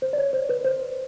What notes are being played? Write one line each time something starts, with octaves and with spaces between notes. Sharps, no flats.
C5
D5
C#5
C5
B4
C5